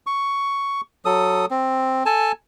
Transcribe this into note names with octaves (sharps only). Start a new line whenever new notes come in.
C#6
F#3 A4 D#6
C4
A4 G#5 A5